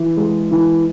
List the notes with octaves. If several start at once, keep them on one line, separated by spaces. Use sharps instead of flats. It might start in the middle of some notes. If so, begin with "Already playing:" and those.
Already playing: E3
G#3
E3